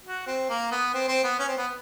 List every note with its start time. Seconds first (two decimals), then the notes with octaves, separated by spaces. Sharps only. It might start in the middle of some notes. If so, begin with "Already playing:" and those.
0.05 F#4
0.27 C4
0.50 A#3
0.72 B3
0.94 C4
1.08 C4
1.24 B3
1.39 C#4
1.48 C4
1.58 B3